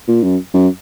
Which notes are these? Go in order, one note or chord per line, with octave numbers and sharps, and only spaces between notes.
A#2
F#2
F#2